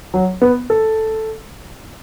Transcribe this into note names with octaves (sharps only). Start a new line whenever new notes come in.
F#3
B3
A4